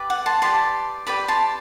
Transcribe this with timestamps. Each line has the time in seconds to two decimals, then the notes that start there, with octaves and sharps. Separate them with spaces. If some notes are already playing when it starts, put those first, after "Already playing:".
Already playing: G4 B4 D5
0.10 F#5
0.26 A5 C6
0.42 G4 B4 D5 A5 C6
1.07 G4 B4 D5 B5 D6
1.28 A5 C6